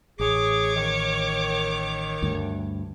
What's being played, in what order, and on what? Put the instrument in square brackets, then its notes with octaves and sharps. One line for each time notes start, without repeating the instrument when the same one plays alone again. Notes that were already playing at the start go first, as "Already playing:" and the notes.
[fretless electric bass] A1 [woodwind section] G#4 [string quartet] C#5 D6
[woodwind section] D#3
[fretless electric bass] D2 G2